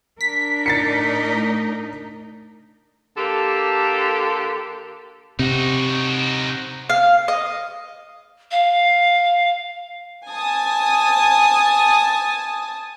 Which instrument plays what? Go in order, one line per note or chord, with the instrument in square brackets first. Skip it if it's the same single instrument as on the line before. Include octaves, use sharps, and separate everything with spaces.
[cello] D4 A#4 [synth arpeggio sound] B6
[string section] A2 D#4 [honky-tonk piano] A6 C7 C#7
[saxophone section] D3 A#3 G4 A4
[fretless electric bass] C3 [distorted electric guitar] D#4 F#4
[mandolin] F5
D#5
[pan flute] F5
[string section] G#5 A5 D#6